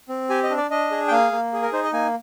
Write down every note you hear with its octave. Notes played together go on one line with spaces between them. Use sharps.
C4
G4 G#5
D#5
D4
D5
D4 D#5
G#4
G5
A#3 F5
A#3
G#4
A#4
D#4 C5
D#5
A#3 G#5